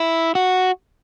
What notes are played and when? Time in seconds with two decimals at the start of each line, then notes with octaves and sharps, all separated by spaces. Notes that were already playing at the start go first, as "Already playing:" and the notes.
Already playing: E4
0.35 F#4